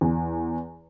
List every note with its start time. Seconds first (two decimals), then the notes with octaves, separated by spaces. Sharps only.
0.01 E2